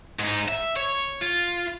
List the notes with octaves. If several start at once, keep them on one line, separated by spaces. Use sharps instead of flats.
G#2 D#4
E5
C#5
F4